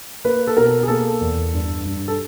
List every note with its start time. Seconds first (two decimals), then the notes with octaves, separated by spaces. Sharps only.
0.25 A#3 B4
0.47 A4
0.57 B2 A#4
0.83 G#4
0.88 A#3 A4
1.21 E2
1.53 G2
1.85 G2
2.08 A4